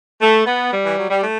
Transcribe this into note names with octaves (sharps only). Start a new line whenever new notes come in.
A3
B3
G3
E3
F#3
G3
A3